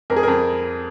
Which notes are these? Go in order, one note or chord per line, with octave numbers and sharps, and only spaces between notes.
F2 A#4
G#4
A#4
F2